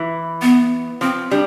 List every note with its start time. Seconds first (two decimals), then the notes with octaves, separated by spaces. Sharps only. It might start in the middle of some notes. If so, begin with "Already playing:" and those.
Already playing: E3
0.42 B3
1.01 F3 C4
1.31 G3 D4